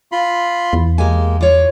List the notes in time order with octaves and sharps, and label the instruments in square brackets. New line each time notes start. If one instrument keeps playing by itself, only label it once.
[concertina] F4 B5 C6
[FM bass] E2
[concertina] G#3 A#3 [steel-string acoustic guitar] G4 G#5
[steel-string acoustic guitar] F4 C#5 [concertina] D6